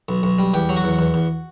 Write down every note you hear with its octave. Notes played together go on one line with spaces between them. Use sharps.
B1
B1
G3
E2 G4
F#3
F#4
E2
E2
E2